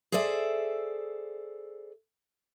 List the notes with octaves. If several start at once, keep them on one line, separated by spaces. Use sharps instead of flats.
G#4 A4 C5 D5 E5